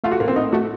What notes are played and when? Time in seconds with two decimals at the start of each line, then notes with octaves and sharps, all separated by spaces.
0.04 A3 F4
0.12 F#4
0.20 A2 A#3
0.28 C4
0.36 A2 D#4
0.53 A3 F#4